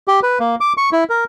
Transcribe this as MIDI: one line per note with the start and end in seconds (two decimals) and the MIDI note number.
0.08 0.20 67
0.23 0.39 71
0.40 0.55 58
0.61 0.73 86
0.77 0.90 85
0.92 1.04 64
1.09 1.24 70